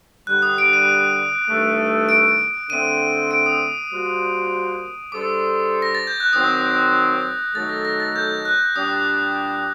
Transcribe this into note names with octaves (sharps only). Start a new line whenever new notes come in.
G2 D3 G3 F#6
D#6
D7
D#7
G2 D#3 A3
D7
D3 A3 C4 D#7
D7
D#6
G3 A#3 F#4 C5
G3 D4 A4 C5 D6
A#6
A6
G6
F#6
D#3 F#3 C4 D#6
D#3 F#3 A3 D#4 A4 A6
A#6
A#6
A6
G6
F#6
A#2 G3 D4 G4 D#6